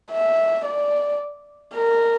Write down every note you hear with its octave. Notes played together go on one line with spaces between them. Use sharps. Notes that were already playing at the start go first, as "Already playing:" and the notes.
E5
D5
A#4